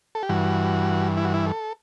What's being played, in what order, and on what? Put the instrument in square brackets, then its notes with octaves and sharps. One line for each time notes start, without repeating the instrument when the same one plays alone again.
[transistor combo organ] A4
G4
G2 E3 F#4
E4
F#4
E4
A4